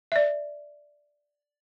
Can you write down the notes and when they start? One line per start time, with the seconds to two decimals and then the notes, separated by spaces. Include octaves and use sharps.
0.12 D5 E5